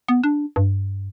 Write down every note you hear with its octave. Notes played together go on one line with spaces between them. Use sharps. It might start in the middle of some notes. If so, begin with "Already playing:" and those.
B3
D4
G2